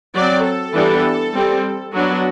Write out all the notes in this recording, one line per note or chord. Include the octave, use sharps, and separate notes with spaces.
F#3 C4 D5
A4
E3 G3 B3 D4
G3 C4
F#3 B3 D4 F#4